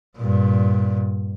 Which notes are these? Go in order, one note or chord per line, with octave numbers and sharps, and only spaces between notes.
G2 A#2